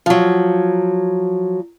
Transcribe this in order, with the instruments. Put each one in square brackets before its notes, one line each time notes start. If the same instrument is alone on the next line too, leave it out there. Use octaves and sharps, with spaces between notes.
[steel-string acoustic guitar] F3 F#3